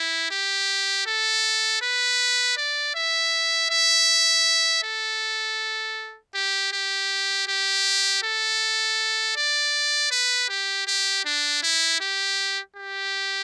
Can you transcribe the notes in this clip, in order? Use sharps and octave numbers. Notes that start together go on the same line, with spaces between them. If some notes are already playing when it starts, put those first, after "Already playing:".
Already playing: E4
G4
A4
B4
D5
E5
E5
A4
G4
G4
G4
A4
D5
B4
G4
G4
D4
E4
G4
G4